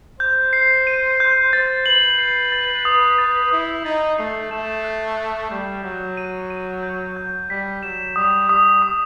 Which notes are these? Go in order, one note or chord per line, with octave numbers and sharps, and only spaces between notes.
C5 G6
C7
D#7
G6
C5 A6
B4 F#7
C7
A6
D#6
A6
E4 D#6
D#4 A6
A3 C7
A3 E7
F#6
F#6
G3 G6
F#3 G6
D#7
D#7
G6
G6
G3 B6
F#3 E7
G3 D#6
G3 D#6
D#6